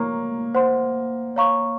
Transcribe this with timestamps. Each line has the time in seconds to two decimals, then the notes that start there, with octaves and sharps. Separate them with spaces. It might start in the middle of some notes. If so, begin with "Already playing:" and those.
Already playing: A#3 C#5 A#5 C#6
0.55 C5 F#5 C6
1.36 C#5 F5 A#5 C#6